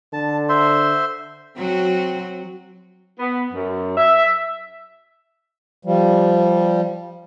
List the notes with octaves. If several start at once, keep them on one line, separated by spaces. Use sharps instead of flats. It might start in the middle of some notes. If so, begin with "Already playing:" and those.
D3 A5
C5 E5 C6
F#3 C4 F#4
B3
F#2
E5
F3 G3